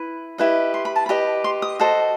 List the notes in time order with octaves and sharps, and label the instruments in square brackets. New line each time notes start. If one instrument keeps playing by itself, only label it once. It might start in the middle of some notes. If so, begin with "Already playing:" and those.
Already playing: [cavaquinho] E4 B4
E4 G4 B4 D#5
C6
B5
A5
G4 B4 D#5 B5
C6
D#6
F#4 A4 C5 D#5